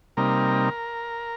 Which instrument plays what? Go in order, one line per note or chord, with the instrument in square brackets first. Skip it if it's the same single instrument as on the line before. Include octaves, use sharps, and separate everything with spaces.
[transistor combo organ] C3 G3 A#3 D#4 A#4